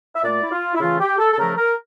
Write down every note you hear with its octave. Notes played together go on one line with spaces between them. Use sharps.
E5
A#2 A3 D5
E4
F4
E4
C#3 E3 A3 F4
G4
A4
A4
C#3 F3 A3 A#4
A#4